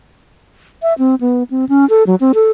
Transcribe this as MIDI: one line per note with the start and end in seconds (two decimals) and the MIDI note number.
0.82 0.94 76
0.98 1.15 60
1.21 1.43 59
1.50 1.65 60
1.69 1.88 61
1.90 2.03 69
2.07 2.15 54
2.20 2.32 60
2.34 2.51 69